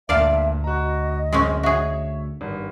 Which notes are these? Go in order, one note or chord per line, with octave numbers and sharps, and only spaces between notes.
D2 G2 A#2 D5 E5 F5 A5
F#4 D#5 A#5
F#2 G#3 C4 C#4
F#4 G#4 C#5 E5
G#1 G2